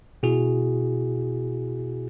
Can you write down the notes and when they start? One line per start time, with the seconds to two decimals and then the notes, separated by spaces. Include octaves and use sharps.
0.23 B2 E4 F#4 G#4